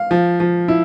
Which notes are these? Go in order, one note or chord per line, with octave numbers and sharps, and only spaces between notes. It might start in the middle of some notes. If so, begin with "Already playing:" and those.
Already playing: F5
F3
F3
E4